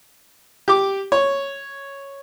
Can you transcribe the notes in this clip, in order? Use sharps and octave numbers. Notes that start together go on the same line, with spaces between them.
G4 D6
C#5